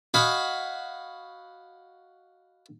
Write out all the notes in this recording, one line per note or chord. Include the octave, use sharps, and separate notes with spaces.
F#4 D#5 F5 G#5 B5